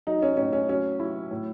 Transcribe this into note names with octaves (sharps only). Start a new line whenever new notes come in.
F#3 D#4
C#4
A2 C#4
C#4
F#3 C#4
F#3 E4
A2